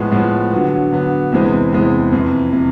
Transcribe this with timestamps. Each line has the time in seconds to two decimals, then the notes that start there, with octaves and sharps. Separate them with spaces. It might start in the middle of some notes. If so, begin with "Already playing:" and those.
Already playing: A2 F3 G#3 B3
0.11 A2 F3 G#3 B3
0.52 D3 F#3 B3
0.92 D3 F#3 B3
1.32 E2 C3 E3 G#3 C4
1.72 E2 C3 E3 G#3 C4
2.12 F2 C3 E3
2.52 C3 E3